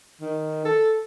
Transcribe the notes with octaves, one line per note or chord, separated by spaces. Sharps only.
D#3
A4